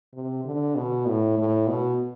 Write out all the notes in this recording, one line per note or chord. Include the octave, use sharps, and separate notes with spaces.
C3
D3
B2
A2
A2
B2